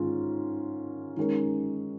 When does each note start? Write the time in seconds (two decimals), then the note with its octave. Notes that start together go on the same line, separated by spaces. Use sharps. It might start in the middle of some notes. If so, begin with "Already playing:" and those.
Already playing: G#2 D#3 C#4 F4
1.17 D#3 G#3 C#4 A#4